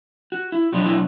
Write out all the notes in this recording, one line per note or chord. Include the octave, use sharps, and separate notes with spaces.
F#4
E4
B2 F#3 B3 D4 F#4
E4